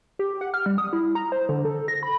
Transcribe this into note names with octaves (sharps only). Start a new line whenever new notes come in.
G4
F#5
F6
G3
D#6
E4
A#5
C5
D3
A4
A#6
B5